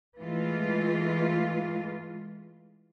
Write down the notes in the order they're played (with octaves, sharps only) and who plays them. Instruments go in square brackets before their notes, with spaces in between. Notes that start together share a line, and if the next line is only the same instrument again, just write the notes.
[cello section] E3 G#3 A3 F4